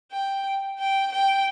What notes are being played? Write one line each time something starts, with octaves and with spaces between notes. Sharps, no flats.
G5
G5
G5